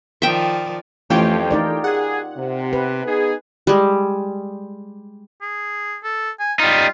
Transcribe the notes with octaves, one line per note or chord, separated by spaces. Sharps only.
D#3 F3 D5 E5 G5
F2 E3 A3 C#4 F4 G4 G5
D#4 A#4 D5
G#4 F#5
C3
B4
B3 D#4 G#4
G3 G#3
G#4
A4
G#5
G3 D#4 F4